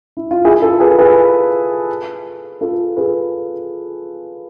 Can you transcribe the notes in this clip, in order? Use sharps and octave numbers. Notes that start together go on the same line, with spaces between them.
E4
F4
E4 G#4
F4 A4
G#4 B4
G#4 B4
F4 A4
G#4 B4